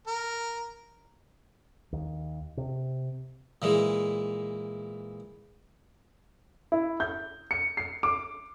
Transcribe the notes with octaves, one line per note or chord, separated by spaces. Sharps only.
A#4
D#2
C3
A#2 E3 G#3
E4
G6
C#7
C7
D6